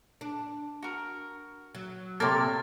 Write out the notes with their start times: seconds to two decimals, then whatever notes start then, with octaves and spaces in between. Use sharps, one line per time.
0.21 D4
0.83 F#4 A#4
1.75 F#3
2.20 C3 A#3 A4 A#4 C#5 A5 A6